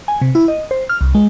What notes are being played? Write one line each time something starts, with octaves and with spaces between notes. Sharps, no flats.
G#5
C3
E4
D#5
C5
F6
C2
G#3